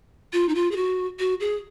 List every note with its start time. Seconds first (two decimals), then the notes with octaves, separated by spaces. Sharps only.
0.33 F4
0.49 D#4
0.55 F4
0.71 G#4
0.76 F#4
1.19 F#4
1.40 G#4